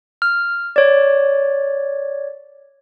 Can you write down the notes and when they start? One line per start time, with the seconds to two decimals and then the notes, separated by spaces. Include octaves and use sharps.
0.22 F6
0.76 C#5 D5